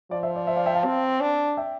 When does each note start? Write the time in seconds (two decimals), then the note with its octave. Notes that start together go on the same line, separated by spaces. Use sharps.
0.11 F3 D5
0.23 C5 E5
0.36 D5
0.47 C5 E5
0.56 D5 F5
0.66 E5 G5
0.75 F5 A5
0.85 C4
1.21 D4
1.57 E5 G5